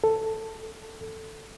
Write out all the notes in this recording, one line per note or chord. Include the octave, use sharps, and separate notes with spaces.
A4